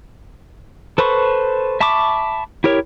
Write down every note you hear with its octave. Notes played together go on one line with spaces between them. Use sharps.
A4 B4 C5 B5 C#6
E5 A5 B5 C#6 D6
E4 G4 A#4 C#5